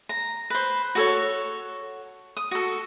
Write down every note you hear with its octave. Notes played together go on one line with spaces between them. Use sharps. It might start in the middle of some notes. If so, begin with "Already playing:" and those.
A#5
B4 C5
F#4 A4 C#5
D#6
F#4 A4